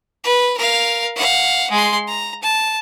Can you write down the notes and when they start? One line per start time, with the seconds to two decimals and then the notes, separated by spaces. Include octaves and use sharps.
0.24 B4
0.57 A#4 F5
1.16 F5 F#5
1.71 G#3 C6
2.08 A#5
2.42 A5